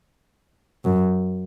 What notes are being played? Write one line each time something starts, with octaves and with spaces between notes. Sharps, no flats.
F#2